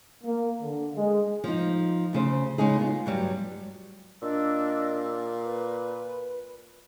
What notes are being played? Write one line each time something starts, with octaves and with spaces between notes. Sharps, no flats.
A#3
D3
G#3
F3 D#4
D2 C#3 C5
C#3 G#3 C#4 D#4 G#4
B3 F4
G2 F#3 G3
A#2 D4 D#5 E6
B4